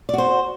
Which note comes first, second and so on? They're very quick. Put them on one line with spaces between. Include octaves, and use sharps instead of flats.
D5 F#4 C5